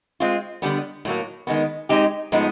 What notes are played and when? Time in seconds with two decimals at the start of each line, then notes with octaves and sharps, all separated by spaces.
0.20 G#3 C4 F4
0.62 D3 G3 B3
1.05 A2 F#3 A#3
1.47 D#3 G#3 B3
1.89 G#3 C4 D#4 G4
2.32 A2 F3 G#3 B3 D#4